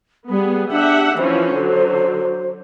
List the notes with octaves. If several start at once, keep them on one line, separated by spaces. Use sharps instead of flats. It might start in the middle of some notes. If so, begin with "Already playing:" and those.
G3 B3 G#4
D4 G4 E5 F#5
E3 F3 C#4 C5
D3 F#3